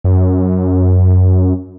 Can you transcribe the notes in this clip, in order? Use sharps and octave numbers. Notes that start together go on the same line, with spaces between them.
F#2